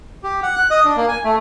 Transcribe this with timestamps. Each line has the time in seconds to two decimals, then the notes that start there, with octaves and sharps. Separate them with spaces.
0.23 G4
0.43 F#5
0.56 F#6
0.70 D#5
0.85 D4
0.96 A#3
1.09 G#5
1.24 A3